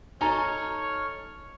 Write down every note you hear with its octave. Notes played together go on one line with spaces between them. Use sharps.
D#4 A4 C#5 D#5 G#5 A#5 C#6 F6